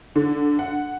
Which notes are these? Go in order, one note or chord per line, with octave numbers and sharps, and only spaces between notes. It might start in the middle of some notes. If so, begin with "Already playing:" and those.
D3
F#5